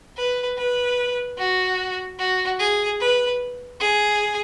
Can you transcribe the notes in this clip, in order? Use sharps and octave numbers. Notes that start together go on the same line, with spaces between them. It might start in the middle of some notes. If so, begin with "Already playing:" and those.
B4
B4
F#4
F#4
G#4
B4
G#4